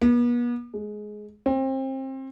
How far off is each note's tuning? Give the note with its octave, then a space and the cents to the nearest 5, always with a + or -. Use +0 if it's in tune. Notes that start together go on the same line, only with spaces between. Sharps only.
B3 -40
G#3 +10
C4 +30